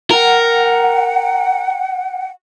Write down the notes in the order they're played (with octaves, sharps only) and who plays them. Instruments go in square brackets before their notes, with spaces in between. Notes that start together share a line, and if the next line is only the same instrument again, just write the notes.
[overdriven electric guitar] A#4 [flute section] F#5 G5